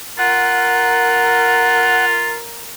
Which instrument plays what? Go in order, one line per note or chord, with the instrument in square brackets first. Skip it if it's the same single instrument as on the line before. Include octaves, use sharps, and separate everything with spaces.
[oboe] F4 [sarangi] A#4 [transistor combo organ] F#5